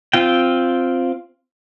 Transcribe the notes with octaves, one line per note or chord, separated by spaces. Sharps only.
C4 F4 G5